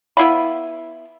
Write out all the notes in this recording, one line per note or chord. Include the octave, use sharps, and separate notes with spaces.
B3 E4 F5 B5